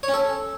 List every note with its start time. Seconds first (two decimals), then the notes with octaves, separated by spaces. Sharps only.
0.03 C#5
0.08 C#4
0.14 A4